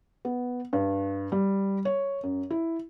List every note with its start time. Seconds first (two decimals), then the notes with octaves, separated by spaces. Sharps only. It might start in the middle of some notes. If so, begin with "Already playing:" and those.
0.25 B3
0.73 G2
1.32 G3
1.85 C#5
2.23 F#2
2.50 E4